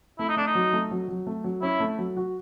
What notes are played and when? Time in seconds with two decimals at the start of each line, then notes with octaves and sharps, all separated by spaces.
0.19 A3 E4
0.29 D#4
0.36 A3 D4
0.47 D#4
0.55 F#3
0.73 A3
0.91 F#3
1.08 F#3
1.27 A3
1.44 F#3
1.62 C#4 E4
1.80 A3
1.98 F#3
2.17 F#4